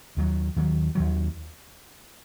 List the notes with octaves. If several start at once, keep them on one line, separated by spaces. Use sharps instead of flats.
D#2 D#3 F#3
D#2 D#3 F#3
D#2 D#3 F#3